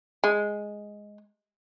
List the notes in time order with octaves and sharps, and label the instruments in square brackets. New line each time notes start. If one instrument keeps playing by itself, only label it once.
[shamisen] G#3